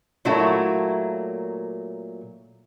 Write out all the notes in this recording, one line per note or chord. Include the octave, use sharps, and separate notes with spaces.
A#2 F#3 A3 A#3 E4 F#4